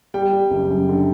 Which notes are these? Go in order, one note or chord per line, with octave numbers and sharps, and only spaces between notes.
G3 G5
G3
F#1
F#2
D3